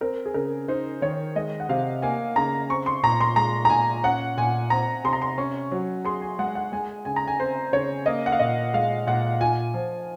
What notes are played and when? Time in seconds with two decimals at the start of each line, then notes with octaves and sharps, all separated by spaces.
0.01 C4 A#4
0.26 G#4
0.34 C#3 A#4
0.68 D#4 C5
1.02 D#3 C#5
1.36 G#3 D#5
1.60 F#5
1.69 C3 F5
2.02 A#3 G#5
2.36 C#3 A#5
2.70 C4 C#6
2.86 C6
3.03 A#2 A#5
3.21 C6
3.36 G#3 A#5
3.65 A#5
3.70 A#2 G#5
4.04 C#4 F#5
4.37 A#2 G#5
4.70 C4 A#5
5.04 C3 C6
5.13 A#5
5.22 C6
5.38 C#4 C#6
5.72 F#3
6.05 G#4 C6
6.22 G#5
6.39 G#3 F#5
6.55 F#5
6.72 G#3 G#5
7.05 C#3 G#5
7.16 A#5
7.27 G#5
7.39 C4 C5
7.72 C#3 C#5
8.06 A#3 D#5
8.26 F#5
8.32 F5
8.39 A#2 D#5
8.74 G#3 F5
9.07 A#2 F#5
9.40 F4 G#5
9.74 F3